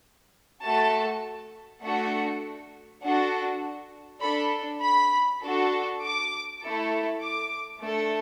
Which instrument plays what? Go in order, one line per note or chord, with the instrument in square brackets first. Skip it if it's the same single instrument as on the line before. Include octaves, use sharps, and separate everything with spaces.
[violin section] A3 F#4 A4 A5
A3 D4 F#4 A4 F#5
D4 F#4 A4 F#5
D4 A4 B5
B5
D4 F#4 A4
D6
A3 E4 A4
D6
A3 D4 A4